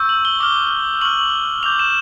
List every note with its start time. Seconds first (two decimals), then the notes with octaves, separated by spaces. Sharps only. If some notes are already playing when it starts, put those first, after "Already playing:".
Already playing: C#6 E6 G6
0.09 F#7
0.25 G7
0.40 D6 F6 G7
1.01 C#6 F6 F#7
1.63 D6 G6 F7
1.79 E7